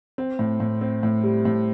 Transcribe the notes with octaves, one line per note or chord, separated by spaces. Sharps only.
C4
A2
A2
C4
A2
G3
A2